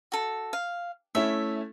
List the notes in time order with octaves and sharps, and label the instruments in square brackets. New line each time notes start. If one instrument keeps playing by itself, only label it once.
[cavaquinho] F#4 A4
F5
[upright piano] A3 C#4 E4 [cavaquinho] E5